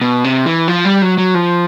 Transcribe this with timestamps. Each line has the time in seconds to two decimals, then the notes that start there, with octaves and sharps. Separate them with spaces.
0.01 B2
0.24 C3
0.46 E3
0.68 F3
0.85 G3
1.02 F#3
1.18 F#3
1.34 F3